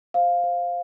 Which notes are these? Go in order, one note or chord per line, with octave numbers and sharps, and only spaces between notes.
C5 F5
C5